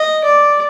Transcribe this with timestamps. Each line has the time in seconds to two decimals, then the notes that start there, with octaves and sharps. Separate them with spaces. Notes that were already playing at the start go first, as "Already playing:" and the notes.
Already playing: D#5
0.24 D5